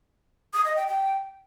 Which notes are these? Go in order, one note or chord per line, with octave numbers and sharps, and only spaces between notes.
D#6
D#5
G5
G5